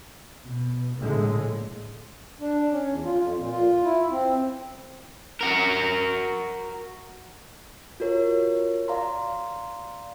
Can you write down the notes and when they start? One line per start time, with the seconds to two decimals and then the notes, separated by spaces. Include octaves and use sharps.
0.43 B2
0.99 A#1 A2 D3 G#3
2.40 D4
2.72 C#4
2.88 E2
3.04 F4
3.20 F2
3.38 A#2
3.50 F4
3.84 E4
4.11 C4
5.41 F#4 A#4
8.00 F4 F#4 A#4 C#5
8.88 D5 F5 A#5 C6